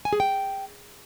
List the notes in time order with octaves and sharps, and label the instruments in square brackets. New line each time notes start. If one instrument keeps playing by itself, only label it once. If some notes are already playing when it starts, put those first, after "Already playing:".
[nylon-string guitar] G#5
G#4
G5